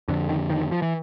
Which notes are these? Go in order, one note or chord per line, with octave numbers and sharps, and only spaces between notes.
F2 D3
D#3
D#3
F3
E3